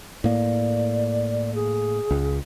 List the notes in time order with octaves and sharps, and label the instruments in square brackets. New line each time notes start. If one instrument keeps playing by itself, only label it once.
[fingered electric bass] A2 A#3 [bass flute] D5
[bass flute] G#4
[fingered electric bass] C#2